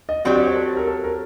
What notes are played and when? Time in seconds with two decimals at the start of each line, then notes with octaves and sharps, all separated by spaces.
0.09 D#5
0.25 F#3 C4 G4 D5
0.36 D5
0.46 C5
0.55 A4
0.77 A#4
0.87 A4
1.04 A#4